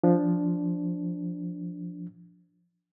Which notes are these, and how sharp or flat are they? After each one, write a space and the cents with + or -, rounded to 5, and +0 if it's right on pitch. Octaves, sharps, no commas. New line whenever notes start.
F3 +0 D4 -5